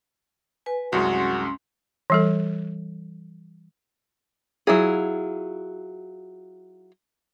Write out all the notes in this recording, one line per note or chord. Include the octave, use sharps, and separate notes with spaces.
B4 G#5
C2 F#2 G#3 C#4 F#4 C6
E3 G3 A4
F#3 E4 F4 G#4